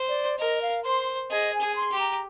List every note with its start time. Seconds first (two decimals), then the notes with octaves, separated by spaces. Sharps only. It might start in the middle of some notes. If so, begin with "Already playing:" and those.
Already playing: C5
0.09 D5
0.39 A#4 D#5
0.62 F5
0.84 C5 C6
1.31 G#4 D#5
1.54 G#5
1.61 G#4
1.76 C6
1.92 G4
2.00 A#5